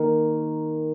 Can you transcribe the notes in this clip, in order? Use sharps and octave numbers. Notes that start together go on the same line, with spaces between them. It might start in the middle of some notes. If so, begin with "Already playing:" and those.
Already playing: D#3 A#3 A#4